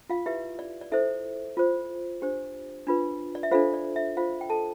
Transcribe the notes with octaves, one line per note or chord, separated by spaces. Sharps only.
F4 F5
E4 G4 B4 E5
D5
D5
E4 A4 C5 E5
F4 C5
D4 G4 C5
D4 F4 B4
D5
E5
D4 F4 A4 C5 F5
D5
E5
F4 C5 F5
G5
A4 A5